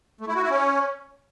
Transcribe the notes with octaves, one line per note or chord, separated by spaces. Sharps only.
A3
E4
F#4
E4
C#4